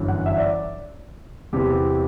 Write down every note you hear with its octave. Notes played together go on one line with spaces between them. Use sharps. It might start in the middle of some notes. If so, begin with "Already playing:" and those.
Already playing: G1 F#2 E3
F#5
E5
D5
E2 C3 E3 B3 G4